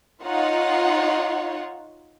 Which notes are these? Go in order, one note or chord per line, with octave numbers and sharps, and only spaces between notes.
D#4 F4 C#5 F#5